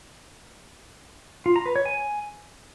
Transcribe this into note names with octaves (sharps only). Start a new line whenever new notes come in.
F4
A#5
B4
C#5
G#5